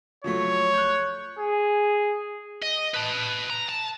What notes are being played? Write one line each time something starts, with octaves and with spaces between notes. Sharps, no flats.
F3 F#3 A3 C#5
F#6 G6
G#4
D#5
B4 A5
A#5
A5